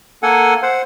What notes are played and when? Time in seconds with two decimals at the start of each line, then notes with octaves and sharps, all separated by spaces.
0.23 A#3 A4 F#5 G#5
0.62 C5 F#5